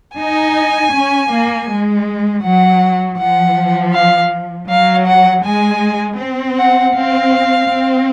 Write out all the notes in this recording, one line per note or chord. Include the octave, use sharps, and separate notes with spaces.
D#4 G#5
C#4
A#3
G#3
F#3 F#5
F3 F#5
F5
F#3 F5
F#5
G#3 G#5
C4
F#5
C4 F5
C4